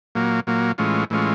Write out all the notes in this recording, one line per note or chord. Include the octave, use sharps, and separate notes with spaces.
A#2 F#3 A#3
A#2 F#3 A#3
A2 E3 G#3 C#4 F4
A2 E3 G#3 C#4 F4